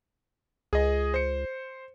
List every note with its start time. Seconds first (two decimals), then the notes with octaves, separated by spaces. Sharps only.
0.73 C#2 G#4 D#5
1.14 C5 C#7